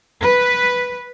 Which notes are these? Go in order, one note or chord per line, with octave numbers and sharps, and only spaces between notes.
B4